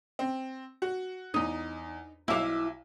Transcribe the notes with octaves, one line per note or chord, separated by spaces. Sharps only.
C4
F#4
E2 D#4 D#6
B1 E4 F5 D6